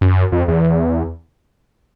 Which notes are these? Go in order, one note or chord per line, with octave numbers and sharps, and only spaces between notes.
F#2
F2
E2